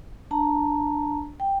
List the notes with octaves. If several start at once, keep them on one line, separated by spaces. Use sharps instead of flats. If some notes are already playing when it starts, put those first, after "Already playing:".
D4 A5 A#5
G5